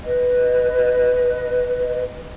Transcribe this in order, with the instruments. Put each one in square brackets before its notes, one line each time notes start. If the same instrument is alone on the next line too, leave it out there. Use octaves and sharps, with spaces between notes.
[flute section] B4 D#5